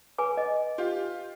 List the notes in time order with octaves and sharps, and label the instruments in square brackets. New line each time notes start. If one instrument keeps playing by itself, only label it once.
[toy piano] B4 G#5 D6
D#5
[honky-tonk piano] F4 G4